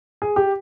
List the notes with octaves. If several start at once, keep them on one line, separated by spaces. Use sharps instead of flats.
G#4
G4